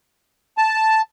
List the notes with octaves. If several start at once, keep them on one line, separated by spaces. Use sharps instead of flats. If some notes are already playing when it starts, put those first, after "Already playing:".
A5